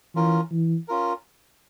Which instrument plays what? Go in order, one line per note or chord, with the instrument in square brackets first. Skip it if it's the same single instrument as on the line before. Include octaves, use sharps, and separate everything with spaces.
[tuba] E3 [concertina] C#4 F4 A#4
[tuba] E3
[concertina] C#4 F4 A#4